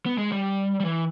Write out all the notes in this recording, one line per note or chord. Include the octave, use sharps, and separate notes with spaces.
B3
G#3
G3
G3
E3